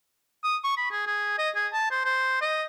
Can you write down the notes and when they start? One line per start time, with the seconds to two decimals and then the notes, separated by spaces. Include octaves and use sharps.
0.44 D#6
0.64 C#6
0.77 B5
0.91 G#4
1.07 G#4
1.39 D#5
1.56 G#4
1.73 A5
1.91 C5
2.05 C5
2.41 D#5